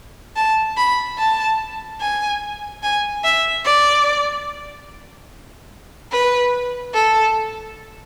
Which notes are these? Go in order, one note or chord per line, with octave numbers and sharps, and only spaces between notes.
A5
B5
A5
G#5
G#5
E5
D5
B4
A4